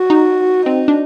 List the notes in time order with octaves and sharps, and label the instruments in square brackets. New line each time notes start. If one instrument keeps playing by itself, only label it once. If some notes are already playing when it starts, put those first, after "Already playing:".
Already playing: [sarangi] F#4
[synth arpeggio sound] D#4
[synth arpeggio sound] C4 [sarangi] D#4
[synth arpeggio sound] D4